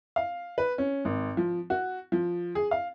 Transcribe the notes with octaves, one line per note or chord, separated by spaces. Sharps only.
F5
B4
C#4
G#1
F3
F#4
F3
G#4
F5